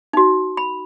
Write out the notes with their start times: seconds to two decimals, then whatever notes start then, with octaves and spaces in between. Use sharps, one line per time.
0.13 D#4 F#4
0.57 B5